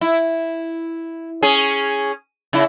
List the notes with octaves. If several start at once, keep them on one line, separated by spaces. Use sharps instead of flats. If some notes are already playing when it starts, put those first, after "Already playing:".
E4
C#4 G#4
C#3 E4